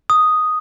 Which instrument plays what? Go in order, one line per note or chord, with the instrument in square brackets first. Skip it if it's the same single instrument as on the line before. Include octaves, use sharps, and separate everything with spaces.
[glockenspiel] D#6